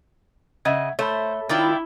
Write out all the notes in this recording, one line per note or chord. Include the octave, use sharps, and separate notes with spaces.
C#3 D#5 E5 F#5 G#6
A3 C5 C#5 E5 B5
D#3 E4 F4 D5 G5